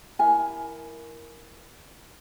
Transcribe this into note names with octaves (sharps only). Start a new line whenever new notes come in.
E4 A#4 G#5